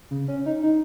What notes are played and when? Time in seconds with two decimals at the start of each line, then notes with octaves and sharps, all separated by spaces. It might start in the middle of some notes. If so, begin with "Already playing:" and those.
0.11 C#3
0.28 C#4
0.46 D#4
0.63 D#4